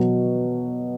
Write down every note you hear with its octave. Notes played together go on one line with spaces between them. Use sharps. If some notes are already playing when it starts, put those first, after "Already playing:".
Already playing: B2 F#3 B3